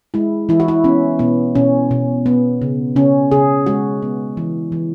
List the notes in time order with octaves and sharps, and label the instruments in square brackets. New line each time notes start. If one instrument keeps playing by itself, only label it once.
[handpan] G#3 E4
E3 E4
F#4
E4
B3 C#4
B2 B3
B2 C#4
B2
B3
C#3
C#3 C#4
C#3 G#4
G#3 F#4
B3
E3
E3